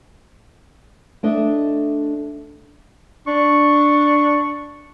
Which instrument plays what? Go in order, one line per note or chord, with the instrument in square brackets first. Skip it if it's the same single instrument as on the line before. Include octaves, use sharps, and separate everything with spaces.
[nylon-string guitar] A3 D4 D#5 E5
[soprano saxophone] D4 [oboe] C#6